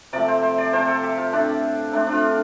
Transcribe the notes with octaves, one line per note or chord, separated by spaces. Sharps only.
C3 F3 A3 D5
C5
C5
D5
C3 F3 A3 C5
A4
G4
F4
A2 A3 C4 D4
A2 A3 C4 D4
D4
F4